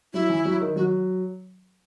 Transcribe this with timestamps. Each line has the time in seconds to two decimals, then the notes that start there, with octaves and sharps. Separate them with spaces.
0.13 F#3 E4
0.30 E3
0.45 F#3
0.60 D#3
0.76 F#3 F#4